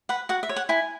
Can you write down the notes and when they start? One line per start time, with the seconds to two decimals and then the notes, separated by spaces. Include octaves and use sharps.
0.09 B4 F#5
0.29 F#4 F#5
0.43 E5
0.49 C#5
0.56 F#5
0.69 E4 G#5